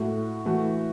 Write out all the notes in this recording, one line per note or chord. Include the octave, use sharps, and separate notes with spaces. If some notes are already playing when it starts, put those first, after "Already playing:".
Already playing: A2 A3 F#4
E3 A3 F#4